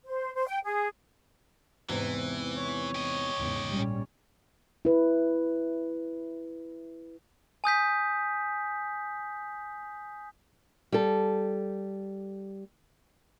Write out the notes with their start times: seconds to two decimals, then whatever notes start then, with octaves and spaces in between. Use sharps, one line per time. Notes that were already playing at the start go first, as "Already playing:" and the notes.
0.06 C5
0.35 C5
0.48 G5
0.65 G#4
1.89 E2 G#2 C3 E3
2.56 C#5
2.95 G4 D#5
3.37 E2 G#2 C#3
3.70 A#1 G3 C#4
4.85 E4 B4
7.64 G#5 D#6 G6 B6
10.92 G3 A4